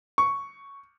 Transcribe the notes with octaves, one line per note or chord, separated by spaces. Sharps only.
C#6